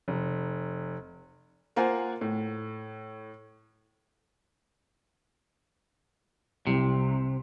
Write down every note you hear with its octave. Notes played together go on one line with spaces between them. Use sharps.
F1
A#3 F4 C5 F#5 G#5
A2
C2 C3